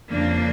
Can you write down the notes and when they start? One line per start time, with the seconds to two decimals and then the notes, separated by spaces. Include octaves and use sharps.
0.09 F2 C#3 F3 A#3 D4